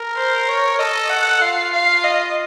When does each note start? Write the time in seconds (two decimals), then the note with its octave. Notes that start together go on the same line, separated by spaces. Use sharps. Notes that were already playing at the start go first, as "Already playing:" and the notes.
Already playing: A#4
0.17 C5
0.48 C#5
0.79 A4 D#5
1.10 F#5
1.41 F4 F5
1.73 F5
2.04 D#5